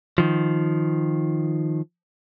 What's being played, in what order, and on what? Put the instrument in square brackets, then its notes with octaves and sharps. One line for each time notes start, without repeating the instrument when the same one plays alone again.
[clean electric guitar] D#3 F3